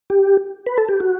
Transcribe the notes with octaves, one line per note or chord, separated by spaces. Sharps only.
G4
B4
A4
G4
F#4